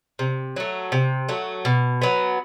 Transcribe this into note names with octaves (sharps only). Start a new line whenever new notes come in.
C3
F#3 A3
C3
F#3 A3
B2
F#3 B3